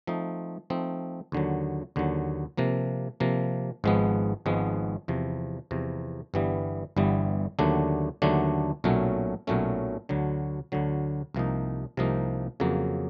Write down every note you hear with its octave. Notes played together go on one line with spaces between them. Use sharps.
F3 A3 C4 D#4
F3 A3 C4 D#4
D#2 D3 F#3
D#2 D3 F#3
C3 F3 A#3
C3 F3 A#3
G#1 G#2 F3 G#3 B3
G#1 G#2 F3 G#3 B3
E2 C3 F3
E2 C3 F3
G1 G2 E3 G3 B3
G1 G2 E3 G3 B3
D#2 D3 F#3 A3 D4
D#2 D3 F#3 A3 D4
B1 A#2 F#3 A3 C#4
B1 A#2 F#3 A3 C#4
D2 D3 F#3
D2 D3 F#3
C2 C3 F3 A#3 D#4
C2 C3 F3 A#3 D#4
F2 C#3 F#3 A#3